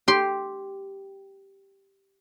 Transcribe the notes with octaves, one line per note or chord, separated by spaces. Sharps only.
G4 C6